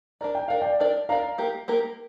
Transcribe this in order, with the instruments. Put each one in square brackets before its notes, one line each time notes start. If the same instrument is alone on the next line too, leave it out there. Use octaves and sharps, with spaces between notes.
[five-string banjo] D4 A#4 D5 [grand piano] A#5
[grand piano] G5
[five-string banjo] D4 A#4 D5 [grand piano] F5
[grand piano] D5 G5
[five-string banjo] D4 A#4 D5
[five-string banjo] D4 A#4 D5 [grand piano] F5 A#5
[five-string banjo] A#3 G4 A#4
A#3 G4 A#4